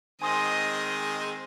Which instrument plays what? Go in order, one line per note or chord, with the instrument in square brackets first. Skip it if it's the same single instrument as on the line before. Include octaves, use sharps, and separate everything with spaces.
[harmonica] D#3 G#3 C4 [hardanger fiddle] D#5 [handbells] G#5 C6 D#6